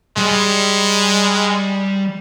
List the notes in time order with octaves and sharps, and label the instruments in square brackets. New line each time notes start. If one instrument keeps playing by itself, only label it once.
[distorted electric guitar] G3 D5 [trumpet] G#3